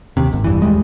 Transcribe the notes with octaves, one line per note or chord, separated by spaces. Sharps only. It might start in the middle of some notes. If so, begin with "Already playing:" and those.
D#2 C3
G#1
F1 G2 E3
D#2 A2 G3 G#3